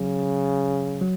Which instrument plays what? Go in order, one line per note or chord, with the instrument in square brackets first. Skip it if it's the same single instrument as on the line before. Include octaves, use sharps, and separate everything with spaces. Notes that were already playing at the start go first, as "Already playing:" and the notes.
Already playing: [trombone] C#3 [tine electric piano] F#3
[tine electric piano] F#3